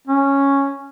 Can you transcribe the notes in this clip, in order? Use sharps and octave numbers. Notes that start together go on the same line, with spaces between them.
C#4